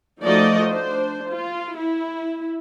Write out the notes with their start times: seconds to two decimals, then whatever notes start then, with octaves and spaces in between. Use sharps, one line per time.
0.22 F3 A3 D#4 F#4 D5 D#5
0.68 D4 C5
1.28 F4
1.77 E4